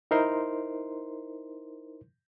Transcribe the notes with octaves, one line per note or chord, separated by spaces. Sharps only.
D#4 E4 A#4 C5 C6